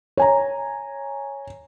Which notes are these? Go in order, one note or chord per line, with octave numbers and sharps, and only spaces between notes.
C#5 G#5 A#5